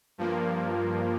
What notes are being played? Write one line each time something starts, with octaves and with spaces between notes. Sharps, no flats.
G2 F3 A#3